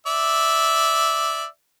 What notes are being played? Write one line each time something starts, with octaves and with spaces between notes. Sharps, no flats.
D5 E5